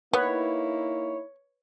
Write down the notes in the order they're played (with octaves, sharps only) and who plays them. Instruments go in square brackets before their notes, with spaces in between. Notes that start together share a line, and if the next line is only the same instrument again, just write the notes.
[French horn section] A#3 D#4 E4 [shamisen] B3 [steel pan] B4 [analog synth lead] C#5